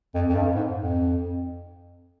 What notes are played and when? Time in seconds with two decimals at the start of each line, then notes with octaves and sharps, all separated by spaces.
0.15 F2
0.29 F2
0.35 G2
0.55 G#2
0.76 F2